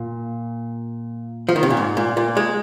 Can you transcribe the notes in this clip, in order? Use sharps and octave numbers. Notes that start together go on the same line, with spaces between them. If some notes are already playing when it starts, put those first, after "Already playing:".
Already playing: A#2
F3
D#3
C3
A#2
G#2
A#2
A#2
G#3